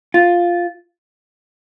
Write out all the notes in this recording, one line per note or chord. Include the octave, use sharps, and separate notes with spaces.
F4